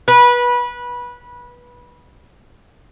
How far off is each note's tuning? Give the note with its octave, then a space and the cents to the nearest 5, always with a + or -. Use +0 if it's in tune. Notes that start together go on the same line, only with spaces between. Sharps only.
B4 -20